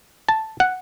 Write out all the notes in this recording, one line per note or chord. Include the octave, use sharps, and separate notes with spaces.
A5
F#5